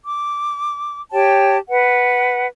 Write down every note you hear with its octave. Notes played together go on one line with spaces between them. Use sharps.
D6
G4 C#5 G5 A5
B4 F#5